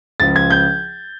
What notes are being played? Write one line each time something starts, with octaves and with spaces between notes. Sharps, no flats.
C#2 C#3 F3 A6
G#6
G6